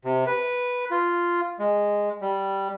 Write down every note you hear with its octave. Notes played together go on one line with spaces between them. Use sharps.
C3
B4
F4
G#3
G3